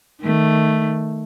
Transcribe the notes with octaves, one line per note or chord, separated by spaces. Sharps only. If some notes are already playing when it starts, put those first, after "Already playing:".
D#3 A3